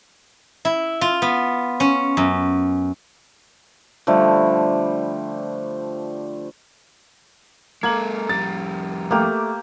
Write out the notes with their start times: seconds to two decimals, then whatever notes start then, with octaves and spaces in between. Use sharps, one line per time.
0.65 E4
1.01 F4
1.22 B3
1.80 C#4
2.17 F#2
4.07 D3 F3 G3 A3
7.83 G#3 A#3 A4 G#6 F#7
8.29 F2 G3 A6
9.11 A3 A#3 G4 F6